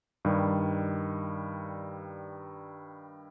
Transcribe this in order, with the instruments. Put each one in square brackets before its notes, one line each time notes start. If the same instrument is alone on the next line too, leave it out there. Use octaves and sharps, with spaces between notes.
[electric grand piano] G2 D#3 G3